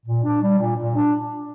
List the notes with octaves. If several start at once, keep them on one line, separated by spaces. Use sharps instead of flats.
A#2
D4
G3
A#2
A#2
D4